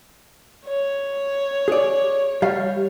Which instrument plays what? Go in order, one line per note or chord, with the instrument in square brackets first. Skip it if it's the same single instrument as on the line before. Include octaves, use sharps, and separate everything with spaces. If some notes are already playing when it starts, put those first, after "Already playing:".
[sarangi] C#5
[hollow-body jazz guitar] G#4 D5
G3 F5